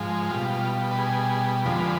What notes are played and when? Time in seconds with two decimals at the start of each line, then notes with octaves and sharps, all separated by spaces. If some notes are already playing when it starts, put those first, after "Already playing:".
Already playing: G#2 F3 G#3
0.31 B2 G3 F4
0.53 F4
0.91 B4
0.98 G#4
1.65 F2 D3 F3 G#3 B4